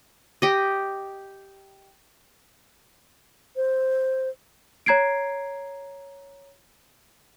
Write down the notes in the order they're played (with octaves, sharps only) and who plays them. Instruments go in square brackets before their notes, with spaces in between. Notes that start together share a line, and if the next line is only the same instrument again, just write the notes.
[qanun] G4 D#5
[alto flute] C5
[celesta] C#5 A#5 G#6 C7 D7